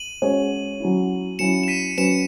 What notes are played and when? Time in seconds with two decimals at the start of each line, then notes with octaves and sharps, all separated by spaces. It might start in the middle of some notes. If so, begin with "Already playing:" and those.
Already playing: D#7 F#7
0.22 G#3 C#4 F#4 C#5
0.80 F#3 C#4 E4
1.39 F#3 C#4 E4 C#7 E7
1.63 E7
1.68 B6 D#7
1.98 F#3 C#4 F#4 B4 C#7 E7